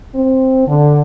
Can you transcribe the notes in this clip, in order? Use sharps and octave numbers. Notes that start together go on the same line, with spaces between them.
C4
D3